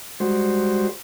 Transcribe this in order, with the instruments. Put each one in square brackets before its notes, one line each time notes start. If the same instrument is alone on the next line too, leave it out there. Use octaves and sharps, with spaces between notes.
[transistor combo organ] G3 G#3 F#4 C5